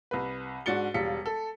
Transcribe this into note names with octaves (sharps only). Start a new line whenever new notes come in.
C2 B4
G#2 D4 F#4 A6 C#7 G7
E1 G3 F5 B6 C#7
A4